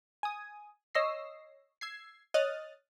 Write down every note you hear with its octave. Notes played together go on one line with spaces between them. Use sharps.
G#5 D#6
C#5 D#5 E6 A#6 C7
E6 G#6 C7
C#5 D#5 D#6 F6 F#6 A6